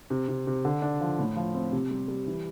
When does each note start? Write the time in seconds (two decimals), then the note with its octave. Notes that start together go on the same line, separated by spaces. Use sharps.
0.10 C3
0.28 C3
0.47 C3
0.65 D3
0.82 D4
1.01 F3
1.19 A2
1.36 F3
1.55 C4
1.72 C3
1.91 G3
2.08 G3
2.27 E3